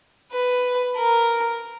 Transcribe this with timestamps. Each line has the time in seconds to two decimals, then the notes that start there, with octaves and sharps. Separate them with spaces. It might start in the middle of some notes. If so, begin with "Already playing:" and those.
0.32 B4
0.97 A#4